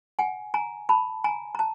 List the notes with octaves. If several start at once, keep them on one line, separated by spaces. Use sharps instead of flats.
F#5 G#5
G#5 A#5
A5 B5
G#5 A#5
A#5
A5